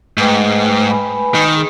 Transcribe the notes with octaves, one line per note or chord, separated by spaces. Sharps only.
G#2 A3 B4 G5
B4 G#5 B5
D#3
G#4